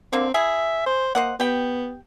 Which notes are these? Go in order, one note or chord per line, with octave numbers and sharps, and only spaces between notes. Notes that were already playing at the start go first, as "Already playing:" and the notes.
D3 A#3 C4 D4
E4 G#4 E5
C5
A#3 C5 D#5 F#5
B3 G4 G5